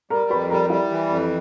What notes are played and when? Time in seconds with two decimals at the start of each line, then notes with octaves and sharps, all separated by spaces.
0.10 G3 A#4 A#5
0.30 F2 B4 B5
0.50 G3 A#4 A#5
0.70 G3 E4 E5
0.90 E3
1.09 F2